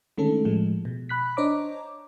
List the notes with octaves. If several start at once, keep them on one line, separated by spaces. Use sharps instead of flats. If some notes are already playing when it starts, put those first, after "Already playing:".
D3 D#3 G#3 A3 C#4 A4
A2 F3 G#3
B2
B5 F#6 B6
D4 C5 C#5 D#5 A#5 D6